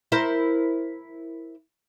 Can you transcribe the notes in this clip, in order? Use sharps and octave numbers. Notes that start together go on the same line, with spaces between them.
E4 A#4 C5